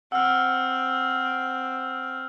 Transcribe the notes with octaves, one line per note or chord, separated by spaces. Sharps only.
C4 F#5 E6 F6